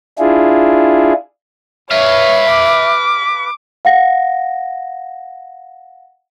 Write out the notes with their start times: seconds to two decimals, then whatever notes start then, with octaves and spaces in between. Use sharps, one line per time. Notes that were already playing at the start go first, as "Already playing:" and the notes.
0.19 D4 E4 F4 G#4
1.91 B4 C#5 E5 F5
2.50 D6
3.85 F5 F#5 A#6